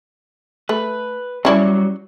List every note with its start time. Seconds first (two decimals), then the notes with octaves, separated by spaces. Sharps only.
0.69 A3 B4
1.45 F#3 G3 C#4 E4 D5